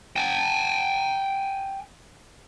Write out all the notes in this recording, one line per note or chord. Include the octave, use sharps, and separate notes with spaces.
G5 G#5